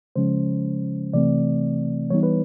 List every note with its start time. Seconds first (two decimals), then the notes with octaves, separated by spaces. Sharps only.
0.16 C#3 F3 G#3 C#4 C5
1.14 C3 E3 A3 C4 D5
2.10 E3 G3 B3 D#4 C#5
2.23 B4